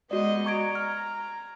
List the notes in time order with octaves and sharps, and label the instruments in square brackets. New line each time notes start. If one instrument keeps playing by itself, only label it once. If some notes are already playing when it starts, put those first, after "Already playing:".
[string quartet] G#3 B3 D#5 [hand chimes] F#4 D5
[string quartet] A#5 [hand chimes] C#6 G#6 D7
[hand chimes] F6